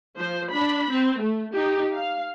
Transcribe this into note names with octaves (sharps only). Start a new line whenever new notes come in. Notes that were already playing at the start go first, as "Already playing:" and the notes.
F3 C5
D4 B5
C4
A3
D#4 G4
F5